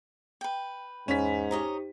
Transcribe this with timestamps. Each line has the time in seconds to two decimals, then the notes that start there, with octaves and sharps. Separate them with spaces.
0.41 B4 G5
1.08 E2 G#2 C#4 B6
1.51 D#4 G4 C5 C#5 D#5 A#5